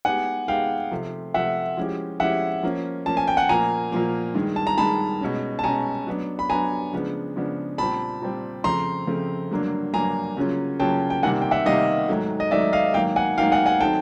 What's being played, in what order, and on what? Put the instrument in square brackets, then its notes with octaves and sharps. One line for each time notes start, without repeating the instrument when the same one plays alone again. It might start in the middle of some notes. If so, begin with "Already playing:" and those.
[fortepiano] G#3 B3 D#4 G4 [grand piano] F#5 G#5
[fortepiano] G#3 B3 D#4 G4 [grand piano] F5 G5
[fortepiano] C3 F3 A3
[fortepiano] C3 F3 A3 [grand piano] E5 F#5
[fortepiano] F3 G#3 C#4 E4 G4
[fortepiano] F3 G#3 C#4 E4 G4 [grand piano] E5 F#5
[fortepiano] F3 A#3 C#4
[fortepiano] F3 A#3 C#4 [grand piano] A5
[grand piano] G#5
G5
F#5 G#5
[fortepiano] A#2 F3 A#3 [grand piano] G#5 A#5
[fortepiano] A#2 F3 A#3
G2 D#3 G#3
[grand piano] A5
A#5
[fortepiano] G2 D#3 G#3 [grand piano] A5 B5
[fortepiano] B2 G#3 C#4
[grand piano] A5
[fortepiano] B2 G#3 C#4 [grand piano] G#5 A#5
[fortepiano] F#3 B3 D4
[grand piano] B5
[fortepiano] F#3 B3 D4 [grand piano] G#5 A#5
[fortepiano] C#3 F3 G#3 B3 D4
C#3 F3 G#3 B3 D4
[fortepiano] A#2 G3 C4 [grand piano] A5 B5
[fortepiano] A#2 G3 C4
[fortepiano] F2 C#3 F3 A3 C4 [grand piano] A#5 C6
[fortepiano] F2 C#3 F3 A3 C4
G2 D3 F#3 A#3 D4
[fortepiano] G2 D3 F#3 A#3 D4 [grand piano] G#5 A#5
[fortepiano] C#3 F#3 A#3 C#4 F4
[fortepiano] C#3 F#3 A#3 C#4 F4 [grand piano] G5 A5
[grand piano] G5
[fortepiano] C3 D#3 G3 A#3 [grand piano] F#5 G#5
[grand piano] G5
E5 F#5
[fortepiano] C3 D#3 G3 A#3 [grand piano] D#5 F5
[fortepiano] G#2 D#3 F#3 A3
[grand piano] D#5
[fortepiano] G#2 D#3 F#3 A3 [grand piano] D5 E5
[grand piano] D#5 F5
[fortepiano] G#2 D#3 F#3 A#3 D#4 [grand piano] F5 G5
[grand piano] F#5 G#5
[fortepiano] G#2 D#3 F#3 A#3 D#4 [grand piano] F5 G5
[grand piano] F#5 G#5
F#5 G#5
[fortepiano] D#3 F#3 A3 C4 D#4 [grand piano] G5 A5